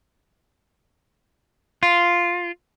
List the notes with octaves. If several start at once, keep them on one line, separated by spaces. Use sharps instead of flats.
F4